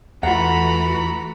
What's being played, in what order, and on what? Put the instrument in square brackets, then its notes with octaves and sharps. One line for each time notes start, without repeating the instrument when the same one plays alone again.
[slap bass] E2 [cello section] E3 A3 F#4 [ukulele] F4 F#5 [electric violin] A#5 B5